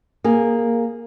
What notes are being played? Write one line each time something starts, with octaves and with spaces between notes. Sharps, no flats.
A#3 G#4